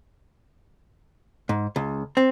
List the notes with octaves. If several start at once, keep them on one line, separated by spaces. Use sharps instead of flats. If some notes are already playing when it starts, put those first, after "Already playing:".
G#2
C#2
C4